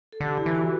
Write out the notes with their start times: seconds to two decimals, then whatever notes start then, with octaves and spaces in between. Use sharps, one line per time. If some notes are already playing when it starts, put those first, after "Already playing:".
0.12 A4
0.20 D3 G4
0.38 E4
0.46 E3
0.55 F#4